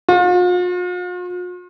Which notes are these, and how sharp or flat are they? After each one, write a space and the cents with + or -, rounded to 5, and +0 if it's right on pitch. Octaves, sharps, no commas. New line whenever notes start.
F4 +45